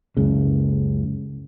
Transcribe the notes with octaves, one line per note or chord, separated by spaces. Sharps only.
F#1 C#2 C#3